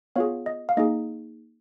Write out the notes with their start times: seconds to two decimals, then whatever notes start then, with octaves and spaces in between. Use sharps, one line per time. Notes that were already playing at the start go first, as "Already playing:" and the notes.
0.16 B3 F4 G#4 C#5 F5
0.46 D#5
0.69 F5
0.77 A#3 D#4 G#4 D#5